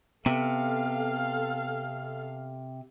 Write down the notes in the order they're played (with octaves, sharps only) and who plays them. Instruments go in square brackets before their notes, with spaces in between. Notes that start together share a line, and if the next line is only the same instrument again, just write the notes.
[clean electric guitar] C3 [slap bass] B3 [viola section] A4 F5